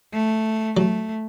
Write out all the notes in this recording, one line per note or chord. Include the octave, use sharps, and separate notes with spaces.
A3
F#3 A3